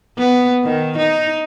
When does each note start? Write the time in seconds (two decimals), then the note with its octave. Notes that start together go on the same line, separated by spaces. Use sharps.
0.18 B3
0.64 D#3
0.98 D#4